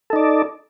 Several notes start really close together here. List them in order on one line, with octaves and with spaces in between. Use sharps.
A4 D#4 D5